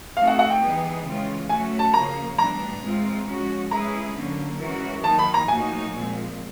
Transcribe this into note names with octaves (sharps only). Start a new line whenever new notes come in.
A3 C4 D#4 F#4 A4 F5
F#5
F#5
G5
E3 G3 B3 D#4 G#4
C#3 E3 G#3 C#4 F4
F#3 A3 C#4 F#4 G#5
A5
C#3 F3 A#3 C#4 A#5
A2 E3 G3 B3 D4 A#5
E3 G#3 C4 F4
F3 G#3 C#4 F#4
G#3 C#4 E4 G#4 B4 A#5
D3 F#3 A#3 C#4
E3 G#3 C#4 F#4 A#4
D#3 F#3 A#3 D#4 A5
B5
A#5
A2 F3 A#3 D#4 F#4 G#5
A#2 F3 G#3 C4